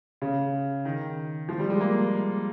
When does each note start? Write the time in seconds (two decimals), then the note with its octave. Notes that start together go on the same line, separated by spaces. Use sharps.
0.22 C#3
0.85 D#3
1.49 F3
1.59 G3
1.70 G#3
1.80 A#3